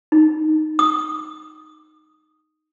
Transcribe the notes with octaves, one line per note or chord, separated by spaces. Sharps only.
D#4
D#6